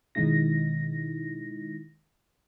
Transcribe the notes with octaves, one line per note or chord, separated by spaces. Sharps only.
B2 D#3 G#3 D#4 E4 A#6